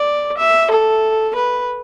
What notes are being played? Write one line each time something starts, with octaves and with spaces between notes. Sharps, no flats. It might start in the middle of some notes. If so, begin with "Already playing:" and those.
Already playing: D5
E5
A4
B4